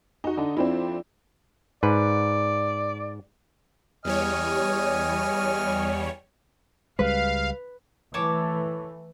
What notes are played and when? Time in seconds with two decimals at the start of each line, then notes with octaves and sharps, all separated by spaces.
0.24 D#4 F#4
0.37 D3 D#4
0.57 F2 C4 D4 E4
1.83 G#2 B4 D5
4.05 E2 G3 C#5 D#5 G#5 F6
6.99 C#2 G3 G#3 B4 F5
8.14 E3 A3 C#5 A5 D6